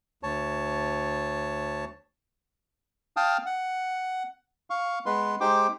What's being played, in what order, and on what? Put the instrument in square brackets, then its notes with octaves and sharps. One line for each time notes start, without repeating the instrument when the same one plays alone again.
[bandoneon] D2 C#5 A5
[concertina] F5 G5 A5 D#6 F6
F#5
F5 C#6
G#3 B3 B4 C6
G#3 D#4 G4 C5 G5 D6